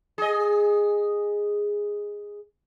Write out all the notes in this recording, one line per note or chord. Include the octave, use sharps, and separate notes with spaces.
G#4 D#5